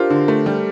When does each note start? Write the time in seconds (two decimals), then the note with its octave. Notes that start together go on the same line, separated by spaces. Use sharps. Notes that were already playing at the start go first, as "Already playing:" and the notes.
Already playing: D4 F4 G4 A#4 C5
0.10 D3
0.28 A3
0.46 G3